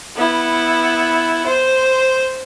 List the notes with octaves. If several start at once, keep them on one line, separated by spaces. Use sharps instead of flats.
B3 E4
C5